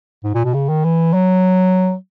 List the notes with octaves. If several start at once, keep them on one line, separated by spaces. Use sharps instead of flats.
G#2
A#2
B2
C#3
D#3
E3
F#3